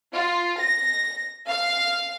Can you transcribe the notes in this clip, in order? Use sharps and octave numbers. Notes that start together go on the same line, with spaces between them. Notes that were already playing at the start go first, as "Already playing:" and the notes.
F4
A#6
F5